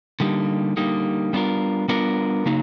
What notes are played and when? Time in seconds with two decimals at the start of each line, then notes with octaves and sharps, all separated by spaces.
0.20 D3 G3 A#3 D#4 G4
0.76 D3 G3 A#3 D#4 G4
1.33 G3 B3 D4 F4 A#4
1.88 G3 B3 D4 F4 A#4
2.46 C#3 F#3 A#3 D#4